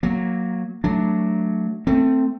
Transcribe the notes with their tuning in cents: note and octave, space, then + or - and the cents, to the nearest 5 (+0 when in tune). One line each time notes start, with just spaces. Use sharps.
F#3 -10 A#3 +0
F#3 +0 A3 +5 D4 +0
A3 +20 C4 +0